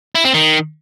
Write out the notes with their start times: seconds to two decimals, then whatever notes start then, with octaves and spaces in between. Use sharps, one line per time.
0.15 E4
0.25 C4
0.34 D#3